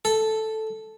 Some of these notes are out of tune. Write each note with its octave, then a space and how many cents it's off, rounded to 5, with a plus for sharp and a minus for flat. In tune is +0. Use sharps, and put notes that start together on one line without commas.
A4 -5